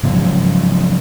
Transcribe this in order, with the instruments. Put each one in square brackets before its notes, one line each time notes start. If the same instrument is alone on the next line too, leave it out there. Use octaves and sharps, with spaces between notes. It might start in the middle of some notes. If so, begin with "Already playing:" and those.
[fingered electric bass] G#2 C#3 F3 F#3